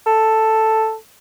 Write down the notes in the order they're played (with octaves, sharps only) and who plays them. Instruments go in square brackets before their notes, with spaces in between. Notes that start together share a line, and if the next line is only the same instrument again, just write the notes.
[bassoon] A4